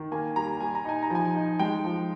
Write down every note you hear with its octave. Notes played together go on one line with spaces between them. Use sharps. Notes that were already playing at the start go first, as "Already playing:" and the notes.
Already playing: D#3
A#3 G#5
G3 A#5
G3 G#5
A#5
D#4 G#5
A#5
F3 G#5
D#4
G#3 G5
F3